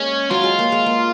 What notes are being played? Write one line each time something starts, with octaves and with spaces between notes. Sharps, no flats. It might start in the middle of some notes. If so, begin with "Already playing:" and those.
Already playing: G#3 A#3 C#4
F#3 F4
G#3
A#3
G#3
A#3